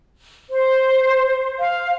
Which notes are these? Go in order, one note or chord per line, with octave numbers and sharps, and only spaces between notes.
C5
F5